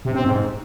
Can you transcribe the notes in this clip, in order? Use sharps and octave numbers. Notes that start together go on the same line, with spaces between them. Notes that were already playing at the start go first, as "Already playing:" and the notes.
C3
C4
G#2